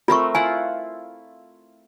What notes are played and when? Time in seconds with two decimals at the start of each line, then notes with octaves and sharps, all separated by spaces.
0.08 A3 C4 F4 A#4 C#6
0.35 E4 F4 F#5 G#5